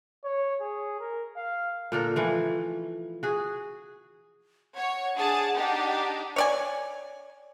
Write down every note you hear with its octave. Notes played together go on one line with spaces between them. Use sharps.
C#5
G#4
A#4
F5
A#2 D3 A4 A#4
E3 F3 A3
F#4 G#4
C#5 F#5
D4 G#4 A5
D4 D#4 G4
C#5 D5 G#5